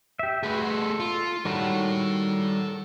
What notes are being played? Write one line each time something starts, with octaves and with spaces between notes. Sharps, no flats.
G4 E5
A3 F#4 G#4 B4
A4
F4
D#3 G3 F#4 A4 C#5